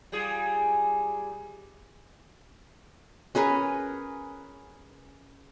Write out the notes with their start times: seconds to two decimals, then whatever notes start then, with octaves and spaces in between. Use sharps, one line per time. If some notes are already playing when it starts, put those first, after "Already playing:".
0.12 G3 F4 G#4
3.35 C#4 G#4 A#4 B4